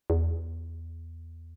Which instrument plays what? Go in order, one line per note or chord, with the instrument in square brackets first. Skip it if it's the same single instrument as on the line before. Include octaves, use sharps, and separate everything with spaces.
[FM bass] E2